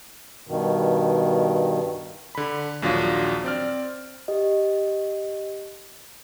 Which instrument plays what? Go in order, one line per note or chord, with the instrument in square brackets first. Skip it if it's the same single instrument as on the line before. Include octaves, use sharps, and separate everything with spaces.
[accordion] G2 B2 D#3
[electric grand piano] D3 B5
A#1 D#2 F#3 D4 F4
C4 D5 F6
[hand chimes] G4 D#5